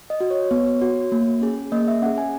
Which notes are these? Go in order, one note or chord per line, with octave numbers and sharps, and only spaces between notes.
D#5
F#4
C#5
B3
F#4
A#3
C#4 G#4
A#3 D#5
E5
C#4 G#4 F#5
G#5